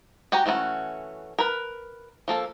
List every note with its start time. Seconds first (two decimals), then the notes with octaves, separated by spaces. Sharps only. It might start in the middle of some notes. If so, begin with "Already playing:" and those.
0.32 F#4 G4 G5 G#5 A#5
0.46 E3 A3 C#4 F4 F#4
1.39 A#4 B4
2.28 F3 A#3 A4